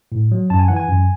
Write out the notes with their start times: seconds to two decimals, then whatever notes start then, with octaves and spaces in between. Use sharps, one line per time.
0.12 A2
0.32 F#3
0.50 F#2 A5
0.59 G#5
0.68 E3 F#5
0.77 G#5
0.89 F#2